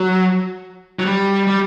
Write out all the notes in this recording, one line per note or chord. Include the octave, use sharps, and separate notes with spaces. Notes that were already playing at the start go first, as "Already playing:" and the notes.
Already playing: F#3
F#3
G3
G3